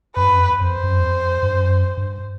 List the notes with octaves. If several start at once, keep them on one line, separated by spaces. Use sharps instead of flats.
F#2 B4
G2
F#2
F2
F2 C5
F#2
E2
F2
G2
F#2
G2